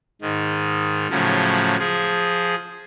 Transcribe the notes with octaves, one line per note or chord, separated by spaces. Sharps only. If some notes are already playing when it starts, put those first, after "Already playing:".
G#2 D#3
A2 C#3 F3 F#3
F3 G#4